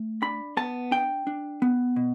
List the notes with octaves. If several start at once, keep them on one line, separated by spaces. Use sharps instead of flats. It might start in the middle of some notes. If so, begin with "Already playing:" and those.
Already playing: A3
D4 B5
B3 A5
D4 G5
D4
B3
B2